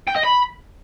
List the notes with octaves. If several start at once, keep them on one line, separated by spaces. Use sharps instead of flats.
G5
D#5
B5